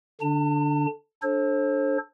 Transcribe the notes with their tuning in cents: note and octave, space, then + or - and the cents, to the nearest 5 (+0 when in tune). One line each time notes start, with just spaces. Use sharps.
D3 +0 D4 +0 A5 +40
D4 +0 A4 -10 C5 +40